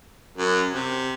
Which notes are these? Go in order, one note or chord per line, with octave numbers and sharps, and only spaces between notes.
F#2
C3